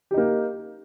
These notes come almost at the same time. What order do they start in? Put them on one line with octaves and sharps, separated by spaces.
G4 D#4 A#3